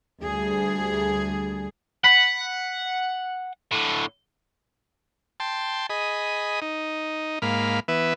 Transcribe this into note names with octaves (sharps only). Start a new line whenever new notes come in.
D2 G3 G#4
F#5 B5
A2 D3
G5 A5 C6
G#4 D#5 B5
D#4
G#2 A#3 F5 B5
E3 B3 B4 E5